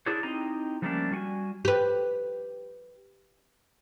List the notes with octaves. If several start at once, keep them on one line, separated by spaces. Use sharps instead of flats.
D4 E4 G#4 A4 C5 C#5
C4 D#4 E4 G4 D#5 A#5
F3 G3 A3 A#3 C#4 D4
G3 F#4 F#5 G#5
G4 B4